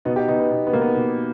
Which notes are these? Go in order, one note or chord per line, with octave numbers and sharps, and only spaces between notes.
B2 B3 D#4
D#4 G4
B2 B3 D#4
B3
B2 B3
B3
B2 A#3
B3
B2